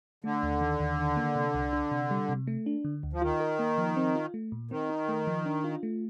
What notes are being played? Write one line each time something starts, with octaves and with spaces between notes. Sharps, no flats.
D3 A3
D#2
D#3
D#2
D#3
A#3
C3
C2
D4
C3
G3
C3
A3
D4
D3
D2
F3
D#3 F4
A#4
A#3
F3
C4
F4
A3
A#2
D#3 C4
D#4
A3
F3
D4
F4
A3